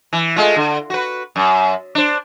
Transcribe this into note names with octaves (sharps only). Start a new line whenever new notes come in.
E3
G#3 A3 F4
D3
F#4 B4
F#2
D4 C5